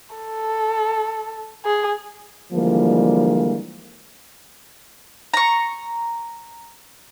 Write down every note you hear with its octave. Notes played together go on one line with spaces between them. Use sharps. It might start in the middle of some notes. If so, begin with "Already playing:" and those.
A4
G#4
D3 E3 F3 G3 G#3 A#3
A#5 C#6